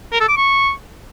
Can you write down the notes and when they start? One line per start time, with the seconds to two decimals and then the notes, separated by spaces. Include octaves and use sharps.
0.13 A#4
0.21 A4
0.29 D6
0.37 C#6